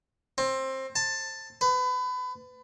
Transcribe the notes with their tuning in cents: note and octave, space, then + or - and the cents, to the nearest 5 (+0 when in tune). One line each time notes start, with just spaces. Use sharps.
C4 +20
A5 +10
B4 +30